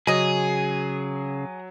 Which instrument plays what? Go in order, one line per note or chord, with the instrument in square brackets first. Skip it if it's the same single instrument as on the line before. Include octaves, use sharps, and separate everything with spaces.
[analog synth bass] C#3 [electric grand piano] F#3 D#7 [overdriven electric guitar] G#4 [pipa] D#5 G#5